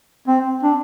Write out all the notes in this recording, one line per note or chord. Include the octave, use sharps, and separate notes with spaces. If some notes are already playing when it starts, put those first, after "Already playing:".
C4
D4